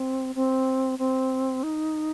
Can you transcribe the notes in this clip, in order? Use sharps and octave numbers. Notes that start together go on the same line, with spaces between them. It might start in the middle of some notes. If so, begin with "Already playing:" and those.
Already playing: C4
C4
C4
D#4